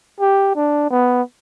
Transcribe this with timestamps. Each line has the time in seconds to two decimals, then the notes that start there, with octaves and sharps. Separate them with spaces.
0.20 G4
0.56 D4
0.91 B3